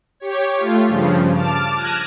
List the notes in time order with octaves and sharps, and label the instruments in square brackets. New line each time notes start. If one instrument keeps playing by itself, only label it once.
[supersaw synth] G4 C#5
A3 F4
G2 C#3 F3
A5 D6 F6
F6 F#6 G#6 A#6 D#7 E7